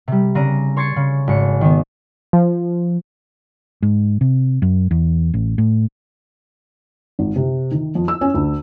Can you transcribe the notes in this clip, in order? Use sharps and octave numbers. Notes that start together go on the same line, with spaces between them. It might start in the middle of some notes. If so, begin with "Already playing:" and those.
C3 G3
C#3 C4 D4 A#5 D#7
C#5 C6 G#6 A6 C7 C#7
C#3
G#1 C#7
D#3 B3
F3
G#2
C3
F#2
E2
A1
A2
G#1
C3
D#3
F2
E6
C#4
D2